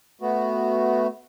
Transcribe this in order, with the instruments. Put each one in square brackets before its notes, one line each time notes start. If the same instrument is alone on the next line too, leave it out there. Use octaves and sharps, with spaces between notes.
[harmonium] A3 B3 F#4